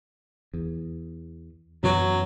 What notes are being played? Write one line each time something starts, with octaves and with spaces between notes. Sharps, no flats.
E2
F#2 B2 E3 F#3